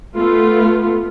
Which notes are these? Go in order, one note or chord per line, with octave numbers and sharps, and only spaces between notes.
A3 B3 F4